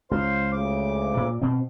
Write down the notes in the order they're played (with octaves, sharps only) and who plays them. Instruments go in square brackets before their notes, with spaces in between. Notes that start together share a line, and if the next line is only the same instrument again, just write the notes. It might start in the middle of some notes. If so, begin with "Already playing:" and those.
[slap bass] C#2 [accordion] C5 F5 C6
[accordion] D2 C#3 D6
[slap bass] A#2
B2 C4